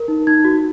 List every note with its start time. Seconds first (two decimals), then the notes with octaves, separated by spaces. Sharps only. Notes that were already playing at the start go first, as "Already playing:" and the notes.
Already playing: A#4
0.08 D#4
0.27 D#4 G#6
0.45 F#4